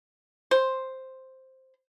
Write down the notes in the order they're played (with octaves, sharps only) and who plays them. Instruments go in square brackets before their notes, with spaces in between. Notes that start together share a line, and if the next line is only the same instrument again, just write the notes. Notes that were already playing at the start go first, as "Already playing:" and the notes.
[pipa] C5